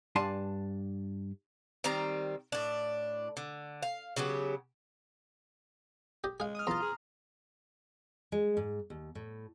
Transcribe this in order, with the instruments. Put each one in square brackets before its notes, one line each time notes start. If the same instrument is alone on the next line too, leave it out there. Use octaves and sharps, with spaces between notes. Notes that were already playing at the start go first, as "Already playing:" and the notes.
[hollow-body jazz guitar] G2 D4 F5 G#5 A5 C6
[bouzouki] D#3 G3 C4 A#5
A2 D4
D3
F5
C#3 F#3 B3 G4
[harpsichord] G4 D#5
[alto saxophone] G#3 [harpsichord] G#4 F5
[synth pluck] D#6 F6
[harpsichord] E2 A5 [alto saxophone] F4 [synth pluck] A#5 C6 F6
[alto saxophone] G#4
[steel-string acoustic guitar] G#3
G#2
D#2
A2